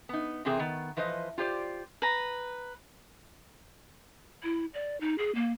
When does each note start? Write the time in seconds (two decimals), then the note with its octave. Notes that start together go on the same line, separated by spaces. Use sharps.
0.09 B3 D#4
0.45 C3 E3 C4 G#4 A#4
0.59 D#3 B3
0.97 E3 F3 B4 C5 D#5
1.38 F4 G4 C5 D5
2.02 B4 A#5
4.43 E4
4.74 D5
5.01 D#4
5.18 G#4
5.35 A#3